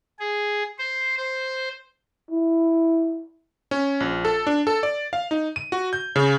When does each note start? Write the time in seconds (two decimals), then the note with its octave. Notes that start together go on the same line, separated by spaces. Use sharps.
0.19 G#4
0.79 C5
1.17 C5
2.31 E4
3.71 C#4
4.00 A#1
4.25 A4
4.47 D4
4.67 A4
4.83 D5
5.13 F5
5.31 D#4
5.56 D#7
5.72 F#4
5.93 G6
6.16 C#3